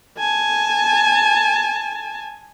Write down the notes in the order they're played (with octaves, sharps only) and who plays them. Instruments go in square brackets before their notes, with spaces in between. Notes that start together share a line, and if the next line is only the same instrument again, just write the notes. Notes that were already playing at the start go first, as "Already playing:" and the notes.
[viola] G#5 A5